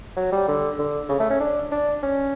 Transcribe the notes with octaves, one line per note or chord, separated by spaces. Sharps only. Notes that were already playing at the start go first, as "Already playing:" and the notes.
F#3
G3
D3
D3
C#3
A3
C#4
D4
D4
C#4